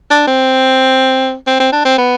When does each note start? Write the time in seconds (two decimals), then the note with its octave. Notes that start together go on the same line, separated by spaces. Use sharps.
0.11 D4
0.27 C4
1.47 C4
1.60 C4
1.72 D4
1.85 C4
1.98 B3